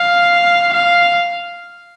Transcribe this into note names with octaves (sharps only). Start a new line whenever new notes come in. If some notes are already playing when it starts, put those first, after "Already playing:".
Already playing: F5
F5